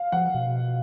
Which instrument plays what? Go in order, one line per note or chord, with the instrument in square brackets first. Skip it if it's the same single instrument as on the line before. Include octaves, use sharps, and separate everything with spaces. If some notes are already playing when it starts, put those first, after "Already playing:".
Already playing: [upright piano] F5
[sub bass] F3 [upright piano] F#5
[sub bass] B2